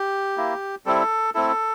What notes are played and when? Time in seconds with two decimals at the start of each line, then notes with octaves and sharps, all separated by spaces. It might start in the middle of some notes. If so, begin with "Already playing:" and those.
Already playing: G4
0.37 A#3 E4
0.86 G3 C4 E4 A4
1.35 A3 C4 E4 A4